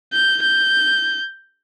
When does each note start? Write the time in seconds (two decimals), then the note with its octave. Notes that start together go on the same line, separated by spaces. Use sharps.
0.13 G6
0.42 G6